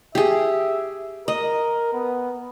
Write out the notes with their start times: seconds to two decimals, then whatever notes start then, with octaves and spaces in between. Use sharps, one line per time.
0.15 G4 G#4 E5
1.28 A#4 D#5
1.93 B3